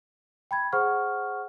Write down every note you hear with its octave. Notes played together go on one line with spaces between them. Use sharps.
G5 B5 G#6
G#4 C5 F#5 C#6 F6